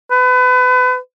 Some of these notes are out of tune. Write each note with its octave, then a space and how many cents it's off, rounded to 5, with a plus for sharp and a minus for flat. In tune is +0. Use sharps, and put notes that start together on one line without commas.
B4 +30